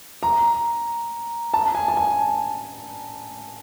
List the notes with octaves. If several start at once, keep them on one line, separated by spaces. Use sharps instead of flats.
A#5
A5
G#5
A5
G#5